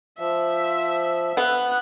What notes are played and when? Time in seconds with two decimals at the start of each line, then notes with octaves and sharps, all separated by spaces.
0.19 F3 E5
1.37 B3 F#6